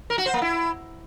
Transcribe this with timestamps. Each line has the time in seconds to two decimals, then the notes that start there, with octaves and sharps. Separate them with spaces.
0.10 A#4
0.18 F#4
0.26 C5
0.34 A#3
0.42 E4